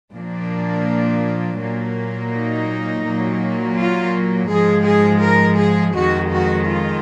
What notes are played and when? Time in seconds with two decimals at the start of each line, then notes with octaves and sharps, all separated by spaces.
0.14 A#2 F3 A#3 D4
1.60 A#2 F#3 A#3
2.32 D#4
3.05 A#2 F#3 A#3
3.78 F4
4.50 G#2 F3 G#3 G#4
4.86 G#4
5.23 A#4
5.59 G#4
5.96 F2 D#3 G#3 F#4
6.32 F#4
6.68 F4